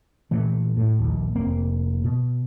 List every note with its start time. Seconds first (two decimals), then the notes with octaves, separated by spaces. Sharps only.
0.31 A#2 E3 A3
0.77 A2
0.99 A#1 D#2
1.35 F1 A#3 C4
2.04 B2